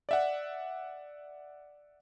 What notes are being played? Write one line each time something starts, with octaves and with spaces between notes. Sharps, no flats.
D5 E5 F#5